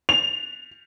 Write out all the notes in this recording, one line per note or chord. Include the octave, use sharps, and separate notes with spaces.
F7